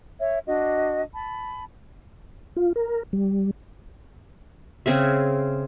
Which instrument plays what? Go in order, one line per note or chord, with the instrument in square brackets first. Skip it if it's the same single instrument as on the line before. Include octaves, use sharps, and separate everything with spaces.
[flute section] C#5 E5
D4 F#4 D#5
A5 B5
[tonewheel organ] F4
A#4
G3
[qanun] C#3 C4 G#4 E5